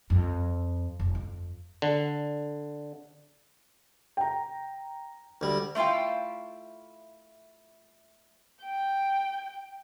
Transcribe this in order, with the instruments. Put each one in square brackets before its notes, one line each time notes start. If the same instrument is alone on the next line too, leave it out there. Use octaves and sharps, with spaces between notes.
[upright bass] F2
F1
F2
[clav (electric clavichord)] D3
[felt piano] G5 A#5
[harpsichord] D2 G3
[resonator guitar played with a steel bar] A3 E4 F4 F5 G5
[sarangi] G5